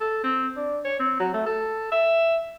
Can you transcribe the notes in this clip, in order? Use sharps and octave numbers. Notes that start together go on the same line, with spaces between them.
A4
C4
D4
C#5
C4
F#3
A3
A4
E5